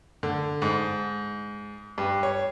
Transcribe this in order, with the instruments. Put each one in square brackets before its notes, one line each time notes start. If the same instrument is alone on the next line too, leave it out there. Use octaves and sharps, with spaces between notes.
[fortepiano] D3
G#2
G2
C#5